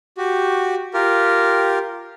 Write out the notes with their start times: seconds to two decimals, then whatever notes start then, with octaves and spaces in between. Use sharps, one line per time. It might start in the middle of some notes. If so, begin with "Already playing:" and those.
0.17 F#4 G4
0.94 F4 G4 A#4